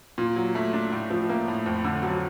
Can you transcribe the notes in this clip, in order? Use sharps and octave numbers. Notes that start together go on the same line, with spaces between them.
A#2
F#3
A3
D4
A2
F3
A#3
A2
F2
D3
F#3